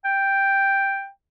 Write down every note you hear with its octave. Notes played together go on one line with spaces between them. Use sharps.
G5